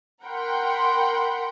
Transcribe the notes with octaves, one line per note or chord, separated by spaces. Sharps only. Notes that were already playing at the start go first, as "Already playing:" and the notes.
A#4 F#5 G5 B5 C6